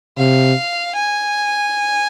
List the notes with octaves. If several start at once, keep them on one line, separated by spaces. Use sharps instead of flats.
C3 F5
G#5